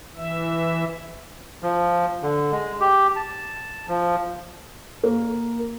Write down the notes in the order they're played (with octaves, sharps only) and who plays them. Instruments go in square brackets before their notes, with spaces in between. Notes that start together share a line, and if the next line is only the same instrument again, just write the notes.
[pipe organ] E3 E5
[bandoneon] F3
D3
G#3
G4
A5
F3
[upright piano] A#3